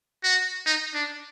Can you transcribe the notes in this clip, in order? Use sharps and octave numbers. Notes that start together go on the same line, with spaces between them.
F#4
D#4
D4